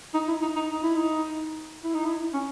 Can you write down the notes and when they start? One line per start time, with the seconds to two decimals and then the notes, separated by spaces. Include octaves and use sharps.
0.14 D#4
0.28 E4
0.42 D#4
0.56 D#4
0.71 D#4
0.83 E4
0.96 D#4
1.84 E4
1.94 D#4
2.05 E4
2.34 C#4